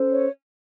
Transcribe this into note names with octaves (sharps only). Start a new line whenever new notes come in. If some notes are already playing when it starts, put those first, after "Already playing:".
Already playing: C#4 A4 C5
C#5